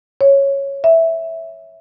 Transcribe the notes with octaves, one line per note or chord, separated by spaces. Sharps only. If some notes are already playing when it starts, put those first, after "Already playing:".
C#5
E5